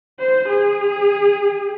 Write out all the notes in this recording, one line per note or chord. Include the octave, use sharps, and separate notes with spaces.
C5
G#4